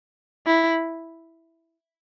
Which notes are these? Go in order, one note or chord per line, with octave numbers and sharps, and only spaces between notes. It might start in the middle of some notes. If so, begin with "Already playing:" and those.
E4